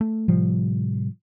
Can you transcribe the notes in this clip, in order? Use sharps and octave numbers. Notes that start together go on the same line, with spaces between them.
A3
A2 C3 F3 G3